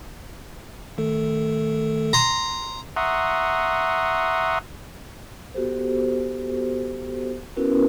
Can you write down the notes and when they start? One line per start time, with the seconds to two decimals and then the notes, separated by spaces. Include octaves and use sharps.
0.98 D#3 A3 A4
2.13 A#5 C6
2.97 E5 F#5 A#5 C6 C#6 D#6
5.54 B3 F#4 G4 A4 C5
7.56 B3 C#4 E4 F#4 A#4 B4